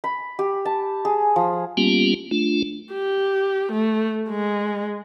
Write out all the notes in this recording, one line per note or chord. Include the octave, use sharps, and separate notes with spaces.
B5
G4
A5
G#4
F3
G3 A#3 B3 C#4 F4 G4
A3 D4 F4
G4
A3
G#3